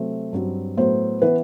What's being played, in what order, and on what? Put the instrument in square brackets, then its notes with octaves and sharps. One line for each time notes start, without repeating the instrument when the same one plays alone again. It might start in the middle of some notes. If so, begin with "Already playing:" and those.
Already playing: [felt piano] C3 F#3 A3 C4
G2 F#3 C4
A2 F#3 B3 C5
E3 B3 B4